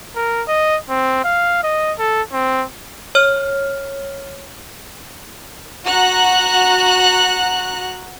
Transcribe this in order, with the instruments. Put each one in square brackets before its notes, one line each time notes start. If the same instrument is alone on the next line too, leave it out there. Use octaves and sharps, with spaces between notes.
[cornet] A#4
D#5
C4
F5
D#5
A4
C4
[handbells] C#5 F6
[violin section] F#4 A#5 F#6